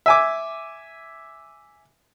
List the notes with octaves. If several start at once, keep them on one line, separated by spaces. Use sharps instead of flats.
E5 G#5 D6